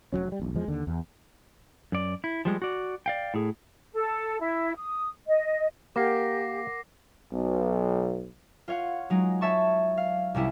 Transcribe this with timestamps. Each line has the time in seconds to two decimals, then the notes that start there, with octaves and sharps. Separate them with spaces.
0.12 F1 F#2 F#3 C#4
0.28 C3 G3
0.40 E1 B1
0.55 E2 F3 G#3
0.68 D#2 D3
0.87 E2
1.92 F#2 D5
2.24 E4
2.45 F3 G3 G#3
2.62 F#4 D5
3.06 D5 F5 G5
3.34 A2 G#4
3.94 A4
4.41 E4
4.77 D#6
5.27 D#5
5.96 A#3 G4 A#4 F#5 D6 A#6 C7
7.32 B1
8.68 F4 C#5 F5 F#5
9.10 F#3 G#3 D#4
9.41 C#5 E5 A5 C#6
9.97 F5
10.34 C2 C3 C#4 E4